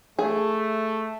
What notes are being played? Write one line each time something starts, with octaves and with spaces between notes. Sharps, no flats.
A3 G#4